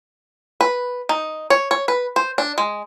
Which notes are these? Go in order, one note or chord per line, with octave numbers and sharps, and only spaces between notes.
B4
D#4
C#5
C#5
B4
C5
D4
G#3